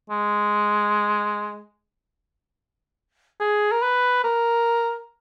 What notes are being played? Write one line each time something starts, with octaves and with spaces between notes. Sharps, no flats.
G#3
G#4
A#4
B4
A#4